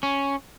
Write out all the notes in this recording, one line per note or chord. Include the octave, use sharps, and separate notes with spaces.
C#4